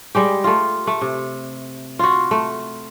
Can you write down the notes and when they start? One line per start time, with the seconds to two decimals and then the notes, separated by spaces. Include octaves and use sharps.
0.15 G3 G#3 G4
0.44 A3 F4
0.87 A3
1.01 C3
1.99 F4 F#4
2.31 A3